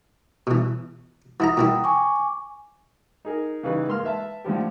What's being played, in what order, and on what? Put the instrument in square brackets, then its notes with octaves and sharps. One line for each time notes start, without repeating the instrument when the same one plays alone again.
[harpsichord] B2 E3
[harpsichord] E3 E4 A#5 [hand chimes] F#5 B5 D#6
[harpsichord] A#2 E3 E4 [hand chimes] G5 A#5
[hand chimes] G#5 C#6 D6
[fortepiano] D#4 G#4 A#4
C#3 E3 G3 D#4 B4
G#2 A#3 C6 F6
B4 E5 A5
A2 D3 F3 G4